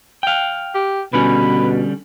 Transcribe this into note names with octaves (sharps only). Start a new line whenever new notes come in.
F5 G5
G4
B2 D3 G3 C#4 B4